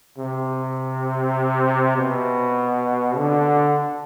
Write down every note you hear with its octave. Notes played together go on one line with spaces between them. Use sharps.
C3
B2
D3